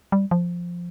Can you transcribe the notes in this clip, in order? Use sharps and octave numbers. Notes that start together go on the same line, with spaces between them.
G3
F3